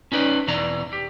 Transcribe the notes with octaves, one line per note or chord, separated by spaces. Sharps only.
C#4 D#4 B4 D5
E2 B2 E3 D5 A#5
G4